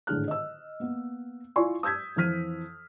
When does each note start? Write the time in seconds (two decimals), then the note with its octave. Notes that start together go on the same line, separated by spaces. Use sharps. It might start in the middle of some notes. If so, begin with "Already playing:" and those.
0.07 G#1 A2 D3 G#4 F6 F#6
0.28 D#5 E6
0.80 A#3 B3
1.56 E4 F4 D5 G#5 C6 C#6
1.83 D#6 E6 G6 G#6 B6
2.16 F2 E3 F3 F6 B6 D#7